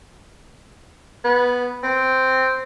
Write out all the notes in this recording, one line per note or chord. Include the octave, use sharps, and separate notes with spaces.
B3
C4